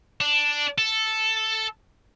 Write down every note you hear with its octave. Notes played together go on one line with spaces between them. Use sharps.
D4
A4